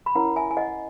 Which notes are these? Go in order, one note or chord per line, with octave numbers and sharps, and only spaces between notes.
B5
C#4 E4 A#4 C#5 F#5 A#5
E5 G#5
G#5
D#5 F#5